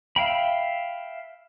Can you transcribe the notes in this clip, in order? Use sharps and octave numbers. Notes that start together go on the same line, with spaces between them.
E5 F5 G5 B5